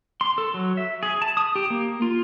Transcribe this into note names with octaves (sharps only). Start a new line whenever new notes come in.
C6
A4
F#3
E5
G#4
A5
D#6
G4
A#3
F4